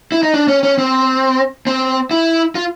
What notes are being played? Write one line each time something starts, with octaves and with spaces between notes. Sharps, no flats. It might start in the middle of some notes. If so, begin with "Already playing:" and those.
E4
D#4
D4
C#4
C#4
C4
C4
E4
F4